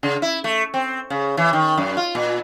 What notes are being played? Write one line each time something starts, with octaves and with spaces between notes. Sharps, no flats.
C#3
E4
A3
C4
C#3
E3
D#3
F#2
F4
A#2